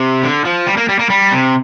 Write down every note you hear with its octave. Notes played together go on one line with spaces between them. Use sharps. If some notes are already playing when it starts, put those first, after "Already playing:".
Already playing: C3
D3
F3
G3
A#3
G3
A#3
G3
C3